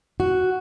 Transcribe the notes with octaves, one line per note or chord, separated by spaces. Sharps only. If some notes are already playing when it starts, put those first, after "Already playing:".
F#4